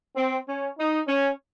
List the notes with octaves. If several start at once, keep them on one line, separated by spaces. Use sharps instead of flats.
C4
C#4
D#4
C#4